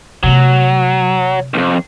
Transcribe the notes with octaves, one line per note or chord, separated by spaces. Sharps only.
C3 F#3 A3
B1 F2